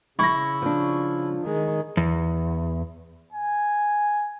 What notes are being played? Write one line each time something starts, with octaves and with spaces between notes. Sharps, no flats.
C#3 E4 C#6 A#6
F3 D4
D#3 G#3
E2
G#5